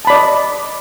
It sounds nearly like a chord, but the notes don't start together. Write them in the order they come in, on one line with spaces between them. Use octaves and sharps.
A5 B5 D5 D#5